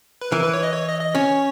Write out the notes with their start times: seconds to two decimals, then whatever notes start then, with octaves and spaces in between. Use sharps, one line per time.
0.21 B4
0.32 E3 A#4
0.43 B4
0.53 C#5
0.63 D#5
0.73 C#5
0.88 D#5
1.01 D#5
1.15 C#4 C#5